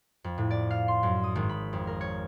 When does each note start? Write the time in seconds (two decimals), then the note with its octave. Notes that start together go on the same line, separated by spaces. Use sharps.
0.24 F2
0.38 A2
0.50 D5
0.70 F5
0.88 C6
1.03 F#2
1.24 D#6
1.35 G#1
1.49 B5
1.73 F2
1.87 A#4
2.01 C#5